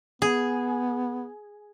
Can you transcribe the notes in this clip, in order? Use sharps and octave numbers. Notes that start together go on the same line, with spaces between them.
B3 G#4